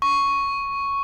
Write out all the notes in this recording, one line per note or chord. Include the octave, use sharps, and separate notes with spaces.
C#6